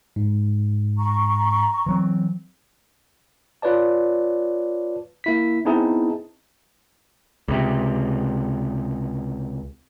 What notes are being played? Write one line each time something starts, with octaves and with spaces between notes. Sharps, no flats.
G#2
A#5 C#6
E3 F#3 C4
F4 B4 C#5 D5 A5
A#3 E4 B6
B3 C4 D#4 E4 G#4 A5
C#2 C3